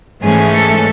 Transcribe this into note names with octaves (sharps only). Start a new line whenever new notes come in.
G#2 E3 A3 C#4 G#4
A4